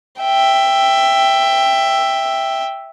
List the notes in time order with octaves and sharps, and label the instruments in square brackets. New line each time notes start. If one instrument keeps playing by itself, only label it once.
[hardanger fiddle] E5 G5